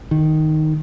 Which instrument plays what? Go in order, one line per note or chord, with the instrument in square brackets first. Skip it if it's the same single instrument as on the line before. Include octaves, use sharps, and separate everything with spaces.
[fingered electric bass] D#3